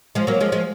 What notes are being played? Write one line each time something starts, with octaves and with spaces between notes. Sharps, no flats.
F3 G#3
F#3 A#3
F3 G#3
F3 G#3